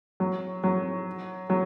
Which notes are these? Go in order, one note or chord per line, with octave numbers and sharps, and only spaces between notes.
F#3
F#3
F#3